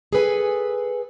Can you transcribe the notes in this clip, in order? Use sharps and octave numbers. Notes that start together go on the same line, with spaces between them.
G#4 A4 B4 G#5